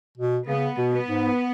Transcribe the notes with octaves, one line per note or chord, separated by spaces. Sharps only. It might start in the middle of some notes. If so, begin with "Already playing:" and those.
B2
C#3 B3
B2
B3
G#2